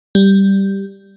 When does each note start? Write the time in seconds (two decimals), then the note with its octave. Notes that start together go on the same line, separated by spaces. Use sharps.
0.15 G3